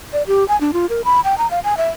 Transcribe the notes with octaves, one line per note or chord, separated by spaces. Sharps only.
D5
G4
G#5
D4
F4
A#4
B5
G5
A#5
F5
G#5
E5